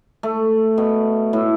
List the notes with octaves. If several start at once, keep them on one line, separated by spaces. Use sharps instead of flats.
A3
B2
A2